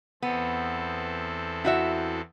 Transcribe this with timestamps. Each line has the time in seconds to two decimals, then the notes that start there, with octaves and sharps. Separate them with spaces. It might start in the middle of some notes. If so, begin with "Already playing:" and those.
0.22 E2 B3 C4 A4
1.64 E4 F#4 E5